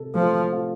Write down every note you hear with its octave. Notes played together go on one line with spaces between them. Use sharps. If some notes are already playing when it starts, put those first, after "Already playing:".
Already playing: C3 A4
F3 A3
F4